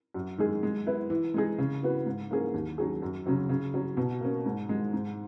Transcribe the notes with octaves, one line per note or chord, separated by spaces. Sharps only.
F#2
D#3 G#3 D#4 G#4
G#3
B3 E4 B4
E3
G#3 D#4 G#4
C#3
E3 B3 F#4 B4
G#2
E3 A#3 C#4 G#4
D#2
D#3 F#3 C#4 G#4
F#2
C#3 F#3 C#4
C#3
F#3 C#4
B2
A#3 C#4
G#2
D#3 G#3
G#2